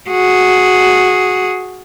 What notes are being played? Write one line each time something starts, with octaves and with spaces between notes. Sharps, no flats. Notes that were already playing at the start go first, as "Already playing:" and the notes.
F#4 G#4